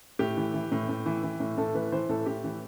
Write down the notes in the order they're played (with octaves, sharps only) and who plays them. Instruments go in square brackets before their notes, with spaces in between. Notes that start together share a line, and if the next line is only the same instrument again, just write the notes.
[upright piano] A2 G4
E3
E3
A2
A2
E3
E3
A2
A2 A4
E3 B4
E3 C5
A2 A4
A2 G4
E3